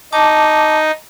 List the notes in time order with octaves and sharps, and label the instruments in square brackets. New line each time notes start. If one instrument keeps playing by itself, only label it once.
[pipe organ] D#4 [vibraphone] A5 D6